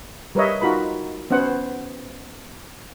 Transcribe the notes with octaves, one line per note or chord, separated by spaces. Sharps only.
G3 A#4 B4 C#5 D#5 E5
D#4 F4 F#4 A#4 B5
B3 C#4 C5 F#5